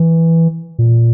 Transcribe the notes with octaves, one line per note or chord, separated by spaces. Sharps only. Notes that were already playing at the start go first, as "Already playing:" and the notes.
Already playing: E3
A#2